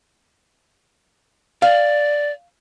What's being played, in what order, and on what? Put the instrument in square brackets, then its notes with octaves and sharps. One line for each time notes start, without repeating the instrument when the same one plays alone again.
[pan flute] D5 [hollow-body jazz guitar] F5